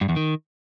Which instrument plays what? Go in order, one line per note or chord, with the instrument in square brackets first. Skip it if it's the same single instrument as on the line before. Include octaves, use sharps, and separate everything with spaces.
[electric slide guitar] G2
E2
D#3